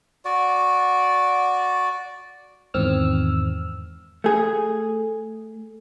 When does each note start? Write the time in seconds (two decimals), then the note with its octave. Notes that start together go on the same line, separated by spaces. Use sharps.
0.25 F#4 D5
2.74 E2 G#2 D#3 C4 E6 F6
4.24 A3 G#4